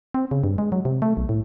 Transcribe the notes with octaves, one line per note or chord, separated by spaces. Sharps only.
C4
C#3
G2
G#3
F#3
C3
A3
B1
A2